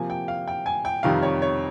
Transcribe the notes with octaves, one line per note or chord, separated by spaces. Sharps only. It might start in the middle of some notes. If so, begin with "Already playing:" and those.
Already playing: C3 F3 A#3 G#5
G5
F5
G5
G#5
G5
F2 C3 D#3 G3 F5
C#5
C#5